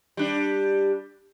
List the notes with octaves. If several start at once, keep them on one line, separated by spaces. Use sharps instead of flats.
G3 D4